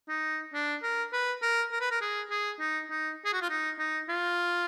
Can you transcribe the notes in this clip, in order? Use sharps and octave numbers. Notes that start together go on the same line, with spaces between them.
D#4
D4
A#4
B4
A#4
A#4
B4
A#4
G#4
G#4
D#4
D#4
G#4
F#4
F4
D#4
D#4
F4